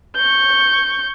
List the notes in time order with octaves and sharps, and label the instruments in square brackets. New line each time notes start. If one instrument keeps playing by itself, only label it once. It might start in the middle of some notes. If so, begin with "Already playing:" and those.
[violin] C#6 G6